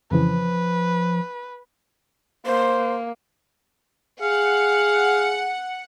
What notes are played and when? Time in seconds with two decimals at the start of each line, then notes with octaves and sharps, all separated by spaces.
0.11 F2 C#3 E3 F3 B4
2.46 A#3 C5
4.21 G#4 F5 F#5